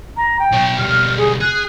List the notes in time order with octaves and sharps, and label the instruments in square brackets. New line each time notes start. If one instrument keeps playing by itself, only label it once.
[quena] A#5
G5
[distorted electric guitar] B2 C#5
[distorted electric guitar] B2 G3 [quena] F6
[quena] G#4
[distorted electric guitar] G#4 [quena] F#6